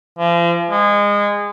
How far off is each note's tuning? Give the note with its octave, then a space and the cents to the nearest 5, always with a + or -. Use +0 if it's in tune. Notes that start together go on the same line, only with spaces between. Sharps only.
F3 -40
G#3 -25